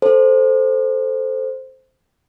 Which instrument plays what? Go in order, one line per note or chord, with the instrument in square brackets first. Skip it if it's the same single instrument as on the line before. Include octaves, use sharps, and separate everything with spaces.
[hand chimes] A4 C5